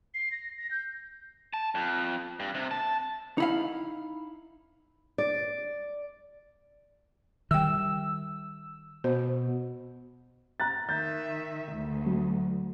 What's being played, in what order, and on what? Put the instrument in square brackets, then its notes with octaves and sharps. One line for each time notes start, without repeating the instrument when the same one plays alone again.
[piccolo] C7
A#6
A#6
G6
[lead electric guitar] A5
F2
G2
C3
A5
[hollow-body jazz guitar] D#4 E4 F5
[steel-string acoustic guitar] D5
[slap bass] D#3 G3 [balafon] E5 G5 [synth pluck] E6
[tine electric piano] B2 [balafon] C5
[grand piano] A#5 F#6 A6
[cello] D#3 E5 [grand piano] G6 A6
[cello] D2
[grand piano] F#3